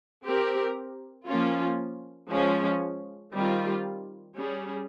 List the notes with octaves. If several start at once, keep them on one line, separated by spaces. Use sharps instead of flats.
C4 G4 A#4
F3 A#3 C#4 F4
F3 G#3 C#4
D#3 G3 C4 F4
G3 C#4 G#4